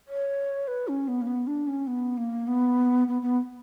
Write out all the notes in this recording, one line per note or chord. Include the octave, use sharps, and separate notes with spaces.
C#5
B4
C#4
B3
A#3
B3
D4
C#4
B3
A#3
B3
B3
B3